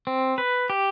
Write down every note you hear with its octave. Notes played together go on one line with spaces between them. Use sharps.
C4
B4
G4